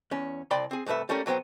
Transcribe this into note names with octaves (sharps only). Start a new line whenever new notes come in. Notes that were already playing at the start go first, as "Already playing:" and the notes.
E2 C#4
C2 D5 G5 B5 C6
C4 G#4
C2 G2 A3 B4 E5
G3 A3 A#3 C#4 A#4
B1 F#3 B3 C5 G5